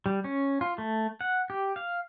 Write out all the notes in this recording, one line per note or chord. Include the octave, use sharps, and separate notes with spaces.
G3
C#4
F4
A3
F#5
G4
F5